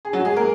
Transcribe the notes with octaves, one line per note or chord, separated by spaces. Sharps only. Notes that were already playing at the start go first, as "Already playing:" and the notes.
G#4
F#3 F#4
G#3 G#4
A#3 A#4